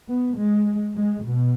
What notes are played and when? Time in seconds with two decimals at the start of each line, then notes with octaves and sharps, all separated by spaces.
0.08 B3
0.37 G#3
0.95 G#3
1.24 B2